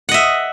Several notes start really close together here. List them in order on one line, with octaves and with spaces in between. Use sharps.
F#5 D#5 E5